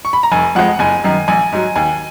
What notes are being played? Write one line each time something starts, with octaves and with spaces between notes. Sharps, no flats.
C#6
B5
A#5
F1 G#5
F2 F3 G#3 F#5
F#1 G#5
F#2 D#3
A#1 G#5
G#2 F#3
D#2 G#5